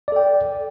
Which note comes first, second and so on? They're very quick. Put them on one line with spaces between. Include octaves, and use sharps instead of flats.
D5 A4 G5